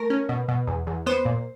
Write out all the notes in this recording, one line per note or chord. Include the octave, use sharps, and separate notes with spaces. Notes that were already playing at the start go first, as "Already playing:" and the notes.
Already playing: A3 A#4
C#4
B2
B2
E2
E2
B3 C5
A#2